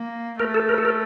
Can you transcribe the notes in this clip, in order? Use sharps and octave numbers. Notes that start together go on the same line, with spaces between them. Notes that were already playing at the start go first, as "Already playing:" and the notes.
Already playing: A#3
A3 A#4
A4
A#4
A4
A#4